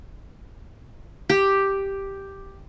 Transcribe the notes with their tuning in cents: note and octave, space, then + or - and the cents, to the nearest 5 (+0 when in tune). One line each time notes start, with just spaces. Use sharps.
G4 +0